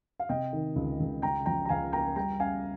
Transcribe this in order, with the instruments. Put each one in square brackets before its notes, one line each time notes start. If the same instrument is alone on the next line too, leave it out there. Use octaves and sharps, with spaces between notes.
[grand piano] F5
C3 D#5 G5
D#3
C#2
C#2
C#3 G5 A#5
F3 G5 A#5
A#5
C#2 F5 G#5
A#3 G5 A#5
G3 G5 A#5
C#4 F5 G#5